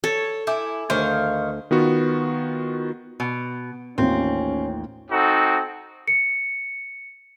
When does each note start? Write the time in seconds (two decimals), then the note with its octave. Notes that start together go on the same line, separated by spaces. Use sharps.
0.04 A4 C#5
0.47 E4 G#5 D6 G6
0.90 D2 D#3 C5 C#5 F5
1.71 D#3 B3 F4 F#4
3.20 B2
3.98 A1 D#2 C4 C#4 F4
5.11 C4 D#4 F#4 A4
6.08 C#7